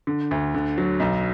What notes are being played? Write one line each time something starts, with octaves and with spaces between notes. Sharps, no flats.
D3
D2
D3
F#3
B1